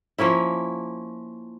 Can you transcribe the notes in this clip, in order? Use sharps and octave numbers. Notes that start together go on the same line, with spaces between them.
F3 A#3 C#4 E4